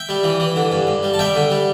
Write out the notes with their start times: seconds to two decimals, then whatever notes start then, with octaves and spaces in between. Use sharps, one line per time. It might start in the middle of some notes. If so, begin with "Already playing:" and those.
Already playing: E5 G5
0.09 G3
0.24 E3
0.40 E3
0.56 D3
0.72 G2
0.87 G2
1.03 G3
1.14 A5
1.19 G3 E5 G5
1.35 D3
1.51 G3